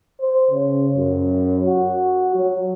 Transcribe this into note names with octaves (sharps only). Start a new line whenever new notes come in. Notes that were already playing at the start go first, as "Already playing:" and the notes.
C5
C#3
F#2
F#4
F#3